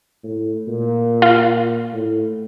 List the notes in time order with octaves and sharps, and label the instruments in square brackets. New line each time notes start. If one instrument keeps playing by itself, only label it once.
[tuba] A2
A#2
[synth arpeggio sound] F4
[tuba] A2